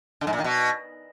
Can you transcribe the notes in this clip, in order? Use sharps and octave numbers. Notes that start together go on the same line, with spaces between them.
D3
G#2
A#2
D#3
B2